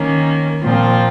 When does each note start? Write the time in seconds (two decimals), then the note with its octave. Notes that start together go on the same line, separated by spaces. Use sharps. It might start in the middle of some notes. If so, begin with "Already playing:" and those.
Already playing: D#3 A#3 C#4
0.63 A#2 F3 C4 F4